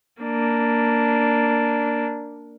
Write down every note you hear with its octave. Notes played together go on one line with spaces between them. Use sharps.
A#3 D4